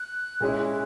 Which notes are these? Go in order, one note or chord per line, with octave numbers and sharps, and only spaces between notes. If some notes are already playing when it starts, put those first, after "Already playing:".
Already playing: F#6
A#2 G#3 C#4 E4